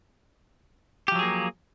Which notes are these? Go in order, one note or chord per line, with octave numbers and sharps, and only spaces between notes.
F3 F#3 A#3 G4 G#4